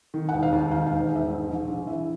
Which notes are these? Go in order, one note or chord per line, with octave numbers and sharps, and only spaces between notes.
D#3
F#5
E1
F5
D#2
D#3 F5
F5
E1
E1
E5
G#2
A#1
A#1
E3 E5